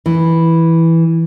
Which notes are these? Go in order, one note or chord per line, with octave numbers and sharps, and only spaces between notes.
E3